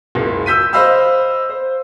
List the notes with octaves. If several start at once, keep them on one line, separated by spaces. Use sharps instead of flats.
F#1 C#2
E6 G6 B6 D#7
C5 D#5 F5 B5 C6 E6
C5